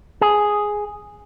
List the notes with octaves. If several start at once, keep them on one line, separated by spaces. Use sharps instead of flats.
G#4